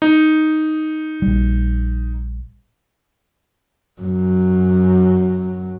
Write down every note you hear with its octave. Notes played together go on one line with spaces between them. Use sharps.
D#4
A#1 G3
F#2 F#3